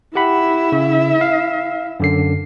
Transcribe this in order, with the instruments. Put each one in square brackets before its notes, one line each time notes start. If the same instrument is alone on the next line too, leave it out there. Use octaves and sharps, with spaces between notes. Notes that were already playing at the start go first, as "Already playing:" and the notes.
[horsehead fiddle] E4 E5 [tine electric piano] G4 F#5 B5
[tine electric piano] C#3
F5
F#2 D3 C7